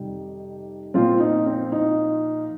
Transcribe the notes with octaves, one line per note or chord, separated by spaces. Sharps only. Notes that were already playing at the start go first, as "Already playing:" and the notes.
Already playing: F2 C3 D#3 G3 D#4 G4
A#2 F3 C4 F4
D#4
C4
D#4